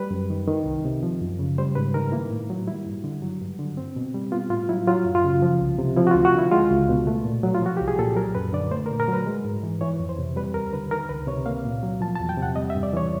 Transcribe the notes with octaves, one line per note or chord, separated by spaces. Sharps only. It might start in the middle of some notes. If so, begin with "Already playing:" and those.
Already playing: G3 B4
F#2
D#3
D#3
C2
C3
F3
F#2
C#3
G3 C5
G#2 B4
D#3 A#4
A#3 E4
A2
F#3
G3 E4
G2
D3
F#3
G2
D3
C4
B2
G3
B3 F4
A2 F4
F#3 E4
F#3 F4
F#2
F4
C#3
F3
C2
C3
F3 E4
F#4
F4
D2
F#4
D3 E4
G#3 F4
C#2
B2
A3
A#2
F#3
F4
F3 F#4
C2 G4
G#4
A#2 A4
F#3 A#4
F#2 B4
D3 D5
A3 C5
A#4
A#2
A#4
F#3 B4
G#3
G#2
E3
E3 C#5
F2
C5
C3
G3 B4
D#2 A#4
D3 B4
D#3 A#4
C#2 B4
C3 C#5
A#3 F5
A#2
F#3
F3 A5
A5
E2
G5
C3
F#5
G3 D#5
E5
G2
D5
E3 C#5